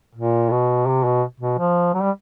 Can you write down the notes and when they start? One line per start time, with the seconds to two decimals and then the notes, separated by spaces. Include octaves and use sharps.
0.15 A#2
0.51 B2
0.87 C3
1.04 B2
1.40 B2
1.59 F3
1.94 F#3
2.02 G3